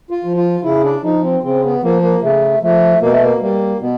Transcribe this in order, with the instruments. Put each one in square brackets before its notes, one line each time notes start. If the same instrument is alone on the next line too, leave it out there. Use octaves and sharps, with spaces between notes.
[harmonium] F4
F3
F4
C#3 E4
D4
F3 D#4
C4
C#3 C4
B3
F3 A#3
A#3
C#3 A3
F3 A3
B2 A#3
A3
A#3
G3 A#3
B2 B3